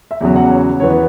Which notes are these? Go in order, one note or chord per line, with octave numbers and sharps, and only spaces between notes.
E5
E2 C#3 F#3
F#5
C#5
E2 E3 B3 C#5
B4